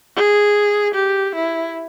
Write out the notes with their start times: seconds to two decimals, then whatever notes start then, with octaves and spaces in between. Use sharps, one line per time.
0.16 G#4
0.95 G4
1.35 E4